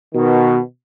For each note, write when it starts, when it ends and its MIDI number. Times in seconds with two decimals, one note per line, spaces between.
0.14 0.57 47
0.14 0.57 51